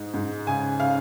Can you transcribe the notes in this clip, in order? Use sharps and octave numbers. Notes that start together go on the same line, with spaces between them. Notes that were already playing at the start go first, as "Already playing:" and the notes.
Already playing: G#2 D#4
G#2
C#3 G#5
C#3 F5